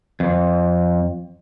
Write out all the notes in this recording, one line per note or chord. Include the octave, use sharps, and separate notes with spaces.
F2